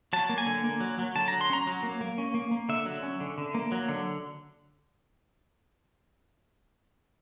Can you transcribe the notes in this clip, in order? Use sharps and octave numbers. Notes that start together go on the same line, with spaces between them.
F#3 A5
A#3
G#5
D3
A#3
F#3
F#3
D3 A5
F#3 A#5
C6
C#4 A#5
F#3
A#3
A#3
C#4
A#3
A#3
D3 E5
F#3
C#4
D3
D3
A#3
F#3
D3